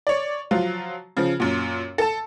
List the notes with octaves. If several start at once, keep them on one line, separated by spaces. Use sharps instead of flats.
C#5 D5
F3 F#3 F4
C#3 F3
F#2 A#2
A4 A5